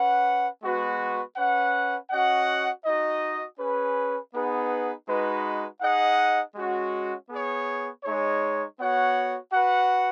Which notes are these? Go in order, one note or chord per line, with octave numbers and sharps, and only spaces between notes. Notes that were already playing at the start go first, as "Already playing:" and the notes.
Already playing: C#4 B4 F#5
G#3 B3 F#4 B4
C#4 B4 F#5
C#4 F#4 D#5 F#5
D#4 F#4 D#5
C#4 G#4 B4
B3 D#4 G#4 B4 F#5
G#3 D#4 F#4 B4
D#4 G#4 D#5 F#5
G#3 C#4 F#4
B3 G#4 C#5
G#3 D#4 G#4 C#5
B3 F#4 C#5 F#5
F#4 B4 F#5